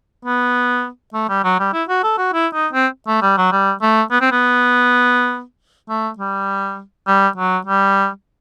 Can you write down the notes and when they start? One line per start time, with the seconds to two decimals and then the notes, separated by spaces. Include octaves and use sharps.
0.25 B3
1.14 A3
1.29 G3
1.44 F#3
1.59 G3
1.73 E4
1.89 F#4
2.03 A4
2.18 F#4
2.33 E4
2.53 D#4
2.73 C4
3.07 A3
3.22 G3
3.37 F#3
3.52 G3
3.82 A3
4.11 B3
4.21 C4
4.32 B3
5.89 A3
6.19 G3
7.07 G3
7.37 F#3
7.66 G3